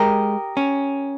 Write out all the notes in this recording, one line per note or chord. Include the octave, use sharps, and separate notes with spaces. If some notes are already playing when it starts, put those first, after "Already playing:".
Already playing: G#3 G4 A#4 D#5
C#4